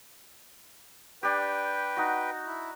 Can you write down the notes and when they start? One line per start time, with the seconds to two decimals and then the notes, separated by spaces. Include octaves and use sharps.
1.23 D4 G4 B4 G5
1.97 D#4 F#4
2.46 E4